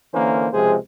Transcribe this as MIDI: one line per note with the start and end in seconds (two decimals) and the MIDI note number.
0.14 0.47 50
0.14 0.47 52
0.14 0.47 58
0.14 0.47 61
0.14 0.47 70
0.14 0.47 72
0.53 0.77 37
0.53 0.77 48
0.53 0.77 53
0.53 0.77 56
0.53 0.77 68
0.53 0.77 72